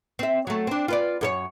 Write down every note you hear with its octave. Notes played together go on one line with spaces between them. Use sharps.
C4 E5
F#3 A3
C4 D4
F4 B4 D5
F#2 A4 C#5